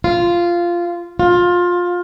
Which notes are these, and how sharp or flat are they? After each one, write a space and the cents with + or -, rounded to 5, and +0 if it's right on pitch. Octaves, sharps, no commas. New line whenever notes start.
F4 -10
F4 +20